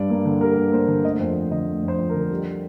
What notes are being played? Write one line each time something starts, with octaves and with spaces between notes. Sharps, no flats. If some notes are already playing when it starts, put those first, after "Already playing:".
Already playing: G2 G3 D5
A#3
D3
G3 A#4
G2
A#3 C5
D3
A3 D#5
F2 C5
F2
D3 D#5
A3
F2
C5
F2
A#4
D3
G3